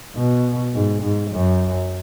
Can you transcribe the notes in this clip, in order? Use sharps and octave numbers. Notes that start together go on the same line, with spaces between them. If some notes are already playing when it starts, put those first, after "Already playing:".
B2
G#2
G#2
F#2